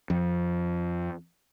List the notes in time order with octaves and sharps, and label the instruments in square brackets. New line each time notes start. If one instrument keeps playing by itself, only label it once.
[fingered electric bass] F2